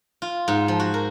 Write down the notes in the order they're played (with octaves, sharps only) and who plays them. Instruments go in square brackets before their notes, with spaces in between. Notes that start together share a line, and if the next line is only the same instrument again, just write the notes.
[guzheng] F4
G#2
F3
F#4
A#4